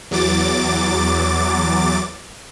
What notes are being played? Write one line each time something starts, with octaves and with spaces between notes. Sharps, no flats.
E2 F#3 D6 A6